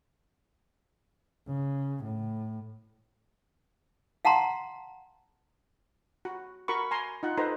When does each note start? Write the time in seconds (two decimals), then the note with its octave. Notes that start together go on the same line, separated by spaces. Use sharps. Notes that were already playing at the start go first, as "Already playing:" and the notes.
1.47 C#3
2.04 A2
4.25 F5 F#5 A5 A#5 C6
6.25 F#4
6.68 F#4 A#4 B5 C#6
6.91 G#5 A#5 C6
7.23 D#4 F4 F#5
7.37 D#4 A4 B4 C5 A#5